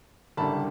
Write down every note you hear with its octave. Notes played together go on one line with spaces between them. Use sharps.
F#1 F#2 D3 G3 A5 B5